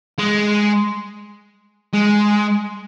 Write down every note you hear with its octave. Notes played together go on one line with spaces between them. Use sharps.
G#3
G#3